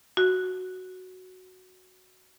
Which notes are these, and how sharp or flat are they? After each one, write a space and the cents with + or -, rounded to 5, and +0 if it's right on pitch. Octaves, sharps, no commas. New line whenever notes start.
F#4 +0